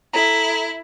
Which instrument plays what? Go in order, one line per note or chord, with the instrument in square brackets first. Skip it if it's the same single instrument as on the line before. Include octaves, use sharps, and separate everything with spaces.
[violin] E4 [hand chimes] A4 A#5